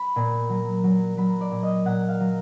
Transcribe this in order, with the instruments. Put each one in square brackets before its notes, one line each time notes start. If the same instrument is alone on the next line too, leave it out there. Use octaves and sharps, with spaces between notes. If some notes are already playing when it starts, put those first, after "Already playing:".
Already playing: [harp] B5
A#2
F#3
F#3
F#3 B5
D5
A#2
D#5
A#2 F#5
F5
F#3